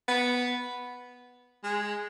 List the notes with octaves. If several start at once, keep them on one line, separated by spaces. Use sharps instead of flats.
B3
G#3